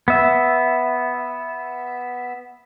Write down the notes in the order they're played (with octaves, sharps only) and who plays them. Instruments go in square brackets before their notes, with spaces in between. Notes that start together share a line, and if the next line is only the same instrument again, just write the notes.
[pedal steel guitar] B3 E5